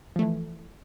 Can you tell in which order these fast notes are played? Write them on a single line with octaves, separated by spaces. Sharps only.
F3 A3 E3